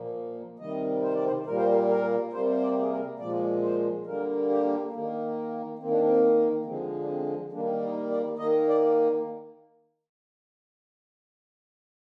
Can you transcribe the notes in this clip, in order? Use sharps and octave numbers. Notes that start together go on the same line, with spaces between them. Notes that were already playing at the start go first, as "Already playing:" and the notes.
Already playing: A#2 F3 A#3
C3 D#3 G3 D#5
C5
D5
C5
A#2 G3 A#3 A#4
C5
A#4
A#4
C3 G3 A#3 C5
C5
D5
G4
G#4
A#4
A#2 F3 G#3 D5
C5
D3 G3 A#3 A#4
G4
D#3 A#3
D#3 A#3 C4
D4
C4
D3 F3 G#3 C4
D4
C4
D#3 G3 A#3 D4
D#4
D5
D#3 A#3 D#5
D5